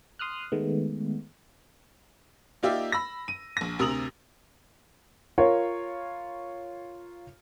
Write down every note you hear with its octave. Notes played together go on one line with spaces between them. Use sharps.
C6 D#6 F6 F#6
D#3 G#3 A3 B3
A#3 D#4 F4 G4 D5 E5
B5 E6 A#6
D#7
A#1 A#6
D2 C3 A#4 D#6 F7 F#7
F4 A#4 C#5